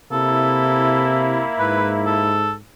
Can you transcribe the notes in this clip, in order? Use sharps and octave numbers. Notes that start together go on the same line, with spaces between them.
C3 A#3 E4 A4
G#2 B4
A4